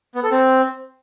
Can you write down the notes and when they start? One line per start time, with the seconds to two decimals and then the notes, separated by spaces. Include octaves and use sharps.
0.15 B3
0.23 A4
0.31 C4